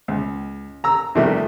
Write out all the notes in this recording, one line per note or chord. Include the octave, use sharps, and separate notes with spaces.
C#2
A#5 E6
E2 C3 D#3 F3 G3 A3